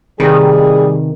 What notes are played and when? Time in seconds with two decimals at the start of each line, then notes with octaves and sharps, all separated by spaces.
0.20 C3 D#3 G3 G#4 B4